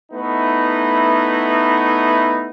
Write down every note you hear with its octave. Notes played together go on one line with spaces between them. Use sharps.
A3 B3 D#4 E4